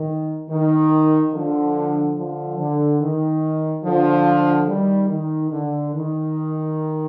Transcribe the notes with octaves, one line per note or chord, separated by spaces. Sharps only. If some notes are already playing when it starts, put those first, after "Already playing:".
Already playing: D#3
D#3
D3 F3
D3 F3
D3
D#3
D3 F3
D#3 G3
D#3
D3
D#3